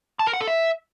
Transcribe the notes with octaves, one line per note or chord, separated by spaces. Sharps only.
A5
A#4
F#5
A4
E5